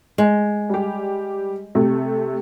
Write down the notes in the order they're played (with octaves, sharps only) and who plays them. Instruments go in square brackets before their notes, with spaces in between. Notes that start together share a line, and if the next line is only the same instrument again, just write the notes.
[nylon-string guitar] G#3
[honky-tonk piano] G3 G4
C3 A3